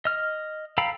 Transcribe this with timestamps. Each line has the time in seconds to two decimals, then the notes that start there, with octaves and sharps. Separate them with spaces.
0.05 D#5 F6
0.78 A4 F5 G5 A#5 B5